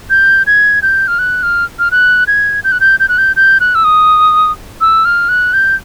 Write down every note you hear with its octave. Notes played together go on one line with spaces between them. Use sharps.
G6
G#6
G6
F6
F#6
F6
F6
F#6
G#6
G6
F#6
G6
G6
F#6
G6
G6
F#6
E6
D#6
E6
F6
F#6
G6